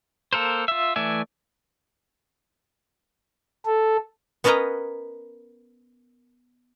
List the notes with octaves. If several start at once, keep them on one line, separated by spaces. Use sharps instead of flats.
A#3 A4 A#4 C5
F4 E5
E3 A3 D5 E5 G#5
A4
B3 C#4 A#4 B4 D#5 A#5